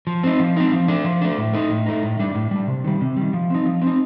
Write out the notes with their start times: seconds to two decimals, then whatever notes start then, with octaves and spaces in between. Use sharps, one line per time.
0.07 F3
0.23 C4 D#4
0.40 F3
0.56 C4 D#4
0.72 F3
0.88 A3 D4
1.04 F3
1.21 A3 D4
1.38 A2
1.53 A3 D#4
1.70 A2
1.86 A3 D#4
2.03 A2
2.20 G3 D4
2.35 A2
2.51 G3 D4
2.68 C3
2.84 D#3 G3
3.01 C3
3.17 D#3 G3
3.33 F3
3.50 C4 D#4
3.66 F3
3.82 C4 D#4